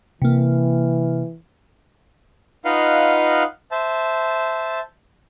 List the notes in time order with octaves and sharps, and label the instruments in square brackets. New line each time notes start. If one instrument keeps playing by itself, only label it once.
[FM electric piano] C3 A#3 [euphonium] E3
[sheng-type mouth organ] D#4 F4 B4 D#5 F5 F#5
C5 E5 A5